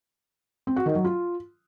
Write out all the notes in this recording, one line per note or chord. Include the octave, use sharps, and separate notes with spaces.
C4
F#4
D#3
F#3
F4